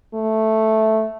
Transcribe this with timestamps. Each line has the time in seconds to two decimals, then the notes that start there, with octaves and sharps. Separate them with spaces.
0.14 A3